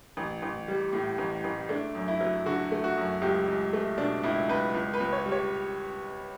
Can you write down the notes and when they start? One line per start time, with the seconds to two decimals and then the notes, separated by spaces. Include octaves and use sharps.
0.17 A1
0.42 A1
0.68 G3
0.93 A2
1.18 A1
1.44 A1
1.69 A3 D4
1.95 F#2
2.08 E4
2.21 F#3
2.46 D3 F#4
2.72 A3
2.84 F#4
2.97 F#2
3.21 C#2 G4
3.48 C#2
3.73 A3
3.98 B2 D4
4.23 C#2 E4
4.49 C#2 B4
4.74 C#2
4.94 B4
5.00 C#2
5.13 C#5
5.26 G3
5.32 C#5